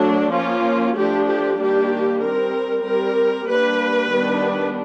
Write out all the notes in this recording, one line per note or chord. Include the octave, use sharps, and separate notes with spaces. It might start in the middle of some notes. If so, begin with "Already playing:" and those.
Already playing: F#3 A3 D4
F3 A#3 C#4 F4
F3 A3 D4 G4
G4
D#3 G3 A#3 D4 G4
G3 C4 A#4
G3 C4 A#4
G3 A#3 D4 B4
D#3 G3 B3 D4